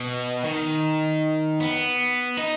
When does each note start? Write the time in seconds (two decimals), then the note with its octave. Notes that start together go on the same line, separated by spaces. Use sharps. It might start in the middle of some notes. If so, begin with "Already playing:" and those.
Already playing: B2
0.44 D#3
1.60 B3
2.37 D#4